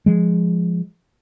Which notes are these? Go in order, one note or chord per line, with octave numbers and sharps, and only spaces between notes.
F3 G#3